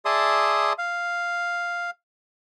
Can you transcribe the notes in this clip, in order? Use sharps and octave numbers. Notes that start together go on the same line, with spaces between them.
G#4 D5 E5 A5 C6 D#6
F5